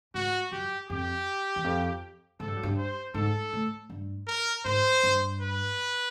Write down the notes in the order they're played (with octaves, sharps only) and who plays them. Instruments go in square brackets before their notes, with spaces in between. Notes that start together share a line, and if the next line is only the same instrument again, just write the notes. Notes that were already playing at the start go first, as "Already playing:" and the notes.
[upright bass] G#2 [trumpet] F#4
[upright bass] F#2 [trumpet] G4
[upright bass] F2 [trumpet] G4
[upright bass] E2
F2
[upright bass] G#2 [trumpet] A4
[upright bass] G2
F#2
G2
[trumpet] C5
[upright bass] G#2 [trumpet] A4
[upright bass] A2
G2
[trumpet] A#4
[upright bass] G#2 [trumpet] C5
[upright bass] G2
[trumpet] B4